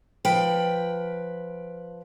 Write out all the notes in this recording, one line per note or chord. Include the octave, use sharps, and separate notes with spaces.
F3 B4 G5